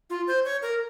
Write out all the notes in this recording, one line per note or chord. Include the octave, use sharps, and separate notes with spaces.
F4
C5
C#5
A#4